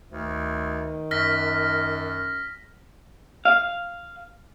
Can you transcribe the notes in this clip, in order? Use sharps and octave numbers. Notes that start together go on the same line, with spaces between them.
D2 D#3
F#2 F6 A#6 B6
F5